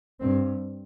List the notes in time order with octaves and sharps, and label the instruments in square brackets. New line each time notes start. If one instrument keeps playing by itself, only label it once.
[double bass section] G2 C4